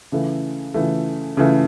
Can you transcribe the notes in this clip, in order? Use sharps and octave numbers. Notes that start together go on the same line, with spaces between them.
C#3 E3 A3
C#3 E3 A3
C#3 E3 A3